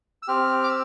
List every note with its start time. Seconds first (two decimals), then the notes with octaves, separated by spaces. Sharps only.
0.23 E6
0.28 C4 G4 F6
0.64 D6
0.69 E6